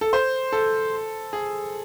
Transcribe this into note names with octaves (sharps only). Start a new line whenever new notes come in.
A4
C5
A4
G#4